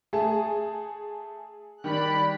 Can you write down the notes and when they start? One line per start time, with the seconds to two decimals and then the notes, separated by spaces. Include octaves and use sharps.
0.13 A3 G#4 A5
1.84 D#3 G3 D5 B5 F#6